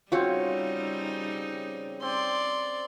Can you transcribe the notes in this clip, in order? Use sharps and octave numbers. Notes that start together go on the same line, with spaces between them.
C#3 G3 C4 D#4 F4 F#4 C#5
C4 D5 C6